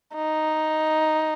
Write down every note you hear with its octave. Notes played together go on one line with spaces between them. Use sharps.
D#4